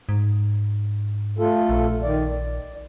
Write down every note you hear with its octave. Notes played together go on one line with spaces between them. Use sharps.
G#2
A3 F4 A4
A#1
D#3 D5
D5